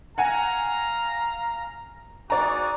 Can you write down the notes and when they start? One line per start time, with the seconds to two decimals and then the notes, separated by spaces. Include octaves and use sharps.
0.18 F5 F#5 G#5 A#5
2.30 D#4 F#4 G#4 D5 A#5